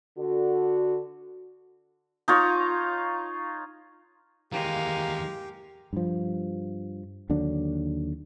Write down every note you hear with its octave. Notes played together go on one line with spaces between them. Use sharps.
D3 F#4
D#4 F4 C#5
D#2 E3 G#3 A#3 G4 F5
G2 F3
D#2 D3 F#3 D4